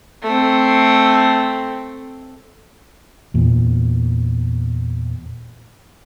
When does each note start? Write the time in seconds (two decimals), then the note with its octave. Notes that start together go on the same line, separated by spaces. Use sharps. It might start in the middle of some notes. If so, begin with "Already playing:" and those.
0.23 A3 C4
3.34 E2 A#2